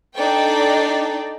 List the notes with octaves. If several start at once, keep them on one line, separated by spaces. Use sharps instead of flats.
D4 D#4 A4 D5 G5